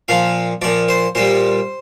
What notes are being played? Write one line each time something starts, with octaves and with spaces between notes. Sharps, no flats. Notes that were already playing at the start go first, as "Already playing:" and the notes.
A#2 F3 F5
A#2 F3 D5
C5
A#2 G3 C5